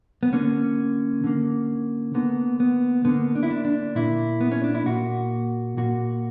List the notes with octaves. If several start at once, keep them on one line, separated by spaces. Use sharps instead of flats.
B3
D3 A#3 C#4
D3 A#3
D3 A#3 B3
B3
D3 A#3 B3
D4
E4
D4
D4
A#2 A#3 E4
B3
C#4
D4
E4
A#2 A#3 F#4
A#2 A#3 F#4